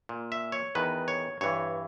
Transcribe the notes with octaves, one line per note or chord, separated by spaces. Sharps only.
A#2
E5
C#5
E2 D#3 B4
C#5
G2 E3 C#5